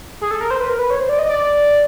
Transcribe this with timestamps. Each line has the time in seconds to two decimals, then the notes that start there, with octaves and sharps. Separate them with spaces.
0.21 G#4
0.31 A4
0.41 A#4
0.51 C5
0.61 B4
0.69 A#4
0.79 B4
0.90 C#5
1.00 C5
1.09 D5
1.19 D#5
1.29 D5